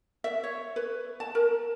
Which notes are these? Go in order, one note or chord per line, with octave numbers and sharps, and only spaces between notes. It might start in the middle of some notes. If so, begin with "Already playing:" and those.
E5
C#5
B4
A5
A#4